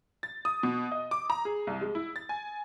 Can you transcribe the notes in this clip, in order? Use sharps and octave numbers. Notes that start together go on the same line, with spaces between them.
A6
D#6
B2
D#5
D6
A#5
G#4
C2
G#3
E4
A6
G#5